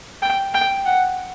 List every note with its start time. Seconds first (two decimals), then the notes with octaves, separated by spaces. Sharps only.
0.23 G5
0.54 G5
0.86 F#5